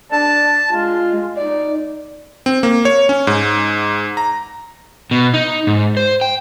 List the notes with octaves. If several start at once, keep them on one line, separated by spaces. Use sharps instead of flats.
D4 A5
G#3 F4
D#4 D5
C4
A#3
C#5
C#4
G#2
A#5
B2
D#4
G#2
C5
G5